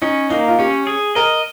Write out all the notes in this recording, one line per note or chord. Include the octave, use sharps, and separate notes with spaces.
C#4 D#4
A#3 D#4
F4
C#4 G4
G#4
A#4 D#5